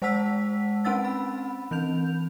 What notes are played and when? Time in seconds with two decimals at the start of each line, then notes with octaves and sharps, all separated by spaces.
0.02 G#3 C5 F#5 A5 E6 B6
0.85 C4 C#4 F#5 E6 A6
1.05 B5
1.71 E3 C4 G6 F7